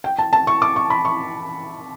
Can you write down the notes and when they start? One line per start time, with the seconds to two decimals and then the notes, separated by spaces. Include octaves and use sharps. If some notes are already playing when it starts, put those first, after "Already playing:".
0.04 G5
0.19 A5
0.33 A5
0.47 C#6
0.62 D6
0.76 C#6
0.90 B5
1.05 C#6